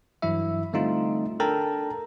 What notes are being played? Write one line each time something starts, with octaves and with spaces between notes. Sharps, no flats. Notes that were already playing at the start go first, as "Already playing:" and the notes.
G2 E3 F#3 E4 E5
D3 G3 A3 C4 D#4 F4
D4 A4 A#4 G5 A5 A#5